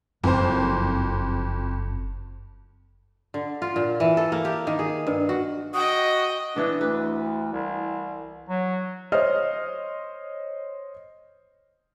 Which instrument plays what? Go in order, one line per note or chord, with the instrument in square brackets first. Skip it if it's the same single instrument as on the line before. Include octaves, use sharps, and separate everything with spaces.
[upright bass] F#1 [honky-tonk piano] F2 C5
[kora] D3
F4
A#2
E3
A4
A#3
G4
D#3
G#4
G2
F#4
[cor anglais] F#4 [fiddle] D#5 G5 [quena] D#6
[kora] E3 B3 [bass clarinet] D4
[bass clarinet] D2 [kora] B4
[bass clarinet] C2
F#3
[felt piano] C5 C#5 D#5 F6